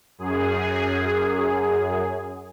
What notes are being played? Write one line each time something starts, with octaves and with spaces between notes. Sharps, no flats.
F#2 G#4